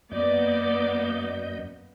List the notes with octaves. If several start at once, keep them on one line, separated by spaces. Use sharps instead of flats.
F#2 A#3 B3 D5 D#5 G6